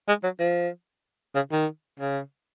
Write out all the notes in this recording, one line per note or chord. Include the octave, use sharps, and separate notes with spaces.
G#3
F#3
F3
C#3
D#3
C#3